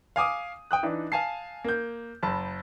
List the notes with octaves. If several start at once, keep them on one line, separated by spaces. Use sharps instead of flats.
F5 G#5 D6 D#6
G5 D#6 F#6
E3 D4 D#4
F5 G#5 A5 C7
A#3 G6
F#1 A5 B5